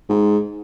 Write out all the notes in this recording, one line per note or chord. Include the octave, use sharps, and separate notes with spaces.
G#2